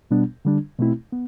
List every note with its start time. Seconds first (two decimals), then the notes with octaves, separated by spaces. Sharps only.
0.11 B2 G3 B3 D4
0.45 D3 G3 D4
0.78 B2 A3 C4 E4
1.13 B3